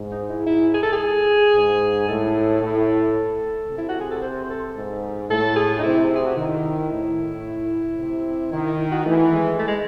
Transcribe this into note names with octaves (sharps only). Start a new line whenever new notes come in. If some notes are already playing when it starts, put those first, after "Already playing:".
Already playing: G#2
D#4
E4
E4
G#4
A4
G#4
G#2
A2 A4
A2
C3
E4
F#4
G#4
A4
C5
C5
A4
G#2
A2 A4
G#4
D#4
C3 E4
G#4
F#4
D#3 E4
A2
C3
D#3 E4
E4
E4
F#4
E3 A3
G#3
A3
G#3